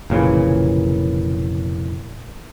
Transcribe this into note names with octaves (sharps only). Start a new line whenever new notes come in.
F1 A#2 C#3 E3